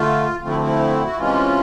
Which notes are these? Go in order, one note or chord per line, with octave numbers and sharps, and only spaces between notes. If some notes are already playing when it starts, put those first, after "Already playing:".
Already playing: D3 A3 F4
D2 D3 F3 A3 C4 F4
E4
E4
F#4
C3 E3 G#3 C#4 F4